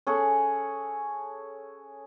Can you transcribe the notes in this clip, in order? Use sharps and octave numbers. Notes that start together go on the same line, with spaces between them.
C#4 G#4 A4 F#5